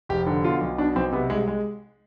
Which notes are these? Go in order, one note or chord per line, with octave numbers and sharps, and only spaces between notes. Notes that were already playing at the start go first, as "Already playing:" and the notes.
F1 G4
D3
B2 F4
B1
B2 D4
B1 C4
C3 B3
C2 G#3
G#3